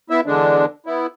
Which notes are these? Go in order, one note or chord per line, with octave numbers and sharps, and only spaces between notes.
B3 E4 E5
E2 D3 G#3 D4
B3 E4